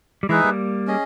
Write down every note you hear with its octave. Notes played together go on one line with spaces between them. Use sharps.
G3
E3 G#3 D#4 G#4 B4 E5
G3 A#3
C#4 G#4 D#5